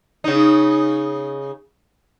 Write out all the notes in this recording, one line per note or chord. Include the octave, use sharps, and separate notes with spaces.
C#3 D#4